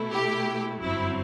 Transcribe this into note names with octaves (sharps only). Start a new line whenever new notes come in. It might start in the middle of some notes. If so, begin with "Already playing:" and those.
Already playing: B2 A3 E4
G4
G1 F#2 F#3 C4 E4